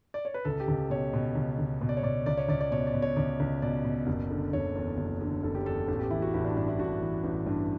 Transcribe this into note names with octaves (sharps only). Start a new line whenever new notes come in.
D5
C#5
B4
C#2 A4
G4
C#2
B2 C#5
B2
C#2
C#2
B2
D5
C#5
B2 D5
C#2 D5
C#5
C#2 D5
D5
B2 C#5
D5
B2
C#5
C#2 D5
C#2
B2 D5
B2
F#1
D3
F#1 C#5
E2
F#1
D3
F#1 A4
G4
E2 A4
A1 A4
G4
E3 E4
F#4
A1 E4
D4
G2 D4
E4
A1 F#4
E3
A1
G2